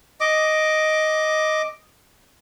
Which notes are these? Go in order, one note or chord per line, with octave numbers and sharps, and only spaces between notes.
D#5 D6